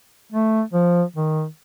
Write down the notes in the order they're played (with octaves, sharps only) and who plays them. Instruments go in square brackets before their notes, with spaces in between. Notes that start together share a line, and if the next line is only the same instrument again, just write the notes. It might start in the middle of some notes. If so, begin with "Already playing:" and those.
[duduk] A3
F3
D#3